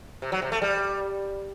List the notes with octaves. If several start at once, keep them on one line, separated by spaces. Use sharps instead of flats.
C3
F#3
C3
A3
G3